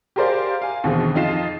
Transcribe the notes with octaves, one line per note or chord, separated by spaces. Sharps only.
G4 G#4 A#4 C5 D5 F5
F5 G#5
D#2 B2 D3 E3 G#3 C4
F2 D#4 F4 C7 E7